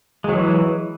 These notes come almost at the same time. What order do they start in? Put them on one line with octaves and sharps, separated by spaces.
G#3 F#3 E3